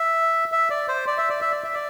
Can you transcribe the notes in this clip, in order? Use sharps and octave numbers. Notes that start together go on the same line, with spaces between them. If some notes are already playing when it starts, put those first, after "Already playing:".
Already playing: E5
E5
D5
C5
D5
E5
D5
E5
D5
E5
D5